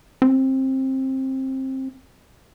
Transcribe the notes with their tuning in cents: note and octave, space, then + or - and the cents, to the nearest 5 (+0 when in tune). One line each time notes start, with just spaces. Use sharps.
C4 +20